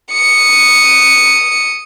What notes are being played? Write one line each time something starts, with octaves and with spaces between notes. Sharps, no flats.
D#6 C#7